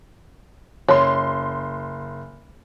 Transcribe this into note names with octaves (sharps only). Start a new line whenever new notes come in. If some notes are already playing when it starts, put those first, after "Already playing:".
F#1 C#5 C6